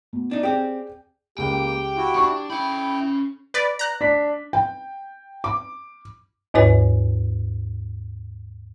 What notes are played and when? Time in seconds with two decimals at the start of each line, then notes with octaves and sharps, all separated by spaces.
0.13 B2
0.31 D4 D#4
0.43 C4 G4 G#4 D5 G5
1.38 C#2 A#3 G4 G5
1.96 E4 F#4
2.16 D4 C#6
2.50 C#4 E4 G5 B5
3.54 B4 D5
3.79 A#5 F#6
4.01 D4 B6
4.53 G5
5.44 D6
6.54 D#2 G#2 E4 B4 C#5 G#5